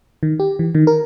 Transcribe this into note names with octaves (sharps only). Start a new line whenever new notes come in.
D#3
G4
E3
D#3
A#4